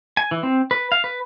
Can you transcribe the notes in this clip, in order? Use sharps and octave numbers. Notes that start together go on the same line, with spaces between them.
G#5
E3
C4
B4
F5
B4